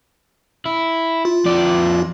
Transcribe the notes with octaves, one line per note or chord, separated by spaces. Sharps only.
E4
F4
F2 D5